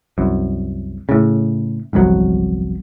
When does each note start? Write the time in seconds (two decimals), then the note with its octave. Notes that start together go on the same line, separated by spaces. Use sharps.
0.18 C2 F#2
1.09 A2 C#3
1.93 G1 C2 F2 F#3